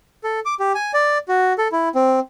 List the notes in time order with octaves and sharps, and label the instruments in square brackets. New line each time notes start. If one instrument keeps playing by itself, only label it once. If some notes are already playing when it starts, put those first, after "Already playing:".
[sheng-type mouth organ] A4
D6
G4
G#5
D5
F#4
A4
E4
C4